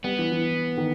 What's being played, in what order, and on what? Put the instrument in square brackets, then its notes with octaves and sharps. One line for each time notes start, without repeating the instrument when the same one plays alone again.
[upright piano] G3 [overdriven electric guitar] B3
[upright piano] E3
E3
D#3